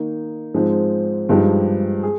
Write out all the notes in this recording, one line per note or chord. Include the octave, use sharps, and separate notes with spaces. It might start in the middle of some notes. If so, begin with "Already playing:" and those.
Already playing: D#3 A#3 D#4
G#2 F3 G#3 C4
G2 F3 G#3 D#4 G4
G#4